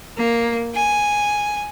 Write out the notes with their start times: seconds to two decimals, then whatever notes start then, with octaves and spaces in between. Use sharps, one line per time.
0.18 A#3
0.75 G#5